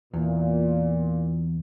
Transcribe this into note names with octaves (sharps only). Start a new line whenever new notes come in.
E2 A#2